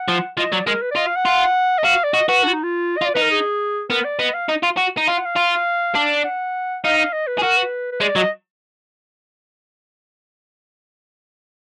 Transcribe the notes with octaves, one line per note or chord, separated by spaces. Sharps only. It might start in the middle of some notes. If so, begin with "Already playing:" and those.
Already playing: F#5
F3
F3 D#5
F#3 D5
G#3 A#4
B4
D5
F4 D#5
F5
F#5
F4
D#5
F#4 F5
D5
F#4 D#5
F#4 B4
D4
F4
D#4
F4
D#5
F4
D5
D#4 B4
A#4
G#4
B3 A#4
D5
B3 D#5
F5
D#4
F4
F#4
D#4
F4 F5
F#5
F5
F4
D4
F#5
D#4 F5
F5
D#5
B4
G#4
F#4 A#4
B4
B4
G#3 D5
F#3 D#5